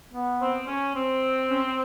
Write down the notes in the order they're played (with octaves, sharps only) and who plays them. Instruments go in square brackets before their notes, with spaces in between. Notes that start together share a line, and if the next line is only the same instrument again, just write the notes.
[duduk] B3
[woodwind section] C4
C#4
C4
[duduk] C#4